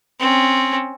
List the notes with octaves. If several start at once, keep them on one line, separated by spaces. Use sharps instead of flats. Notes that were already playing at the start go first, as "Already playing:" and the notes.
C4 C#4